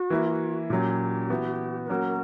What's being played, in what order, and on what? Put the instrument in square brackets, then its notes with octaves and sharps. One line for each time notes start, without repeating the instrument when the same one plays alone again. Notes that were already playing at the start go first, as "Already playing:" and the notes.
Already playing: [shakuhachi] F#4
[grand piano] E3 A#3 E4
[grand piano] A#2 F#3 C#4 [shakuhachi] G4
[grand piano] E3 B3 F#4
[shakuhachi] B4
[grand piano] F#3 A#3 C#4 F#4 [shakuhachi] A#4